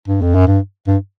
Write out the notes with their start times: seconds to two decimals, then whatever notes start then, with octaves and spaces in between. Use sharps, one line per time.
0.08 G2
0.22 F2
0.35 F#2
0.47 G2
0.88 G2